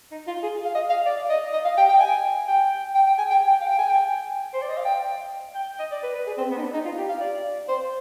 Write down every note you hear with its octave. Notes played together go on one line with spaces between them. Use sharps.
D#4
F4
G#4
F5
D#5
F5
D5
D#5
D#5
F5
G5
G5
G#5
G5
G5
G5
G#5
G5
G5
F5
G5
G#5
G5
C5
D5
D#5
F5
G5
G5
D#5
D5
B4
B4
G#4
C4
B3
D#4
D4
D#4
F4
G4
F5
D5
C5